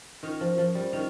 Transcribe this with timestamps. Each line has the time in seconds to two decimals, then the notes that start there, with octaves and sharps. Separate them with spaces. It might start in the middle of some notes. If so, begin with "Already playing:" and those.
0.23 D#3 C#4 F4 A#4
0.41 F3
0.58 F3
0.75 G3
0.93 D#3 C#4 F4